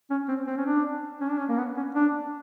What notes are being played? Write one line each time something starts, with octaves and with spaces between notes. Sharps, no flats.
C#4
C4
C4
C#4
D4
C#4
D4
C#4
A#3
B3
C#4
D4